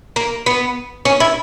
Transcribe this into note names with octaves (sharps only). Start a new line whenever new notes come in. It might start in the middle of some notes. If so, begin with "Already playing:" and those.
A#3
B3
C#4
E4